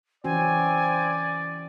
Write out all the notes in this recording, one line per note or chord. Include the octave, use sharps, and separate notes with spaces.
E3 C4 C#4 F#4 D5 G#5